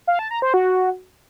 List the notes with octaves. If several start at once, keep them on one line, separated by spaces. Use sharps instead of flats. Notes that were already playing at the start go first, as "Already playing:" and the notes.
F5
A5
A#5
C5
F#4